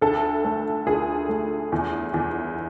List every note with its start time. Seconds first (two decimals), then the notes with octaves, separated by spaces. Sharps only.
0.01 D2 A4
0.44 A3
0.87 D2 G#4
1.29 A3
1.72 E2
2.14 E2